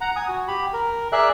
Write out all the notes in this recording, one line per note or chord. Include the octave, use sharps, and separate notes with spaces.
F#5 A#5
G#5 D#6
F#4
G4 B5
A#4
G#4 A#4 D5 E5 F#6